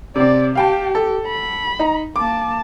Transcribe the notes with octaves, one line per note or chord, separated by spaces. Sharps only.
C3 C4 D5
G4 F5 G5 A5
A4
B5
D#4 A#5
A#3 A5 D6